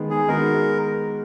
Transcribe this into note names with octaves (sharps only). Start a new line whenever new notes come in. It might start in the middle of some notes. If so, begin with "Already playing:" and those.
Already playing: D#3 G#3 B3
G#4
D#3 G#3 B3 F#4 A#4